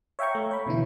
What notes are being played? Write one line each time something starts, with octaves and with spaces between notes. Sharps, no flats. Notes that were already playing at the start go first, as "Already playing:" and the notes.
C#5 E5 F5 G5 A#5 C#6
A3
C#5 B5
B2 D3 E3 E4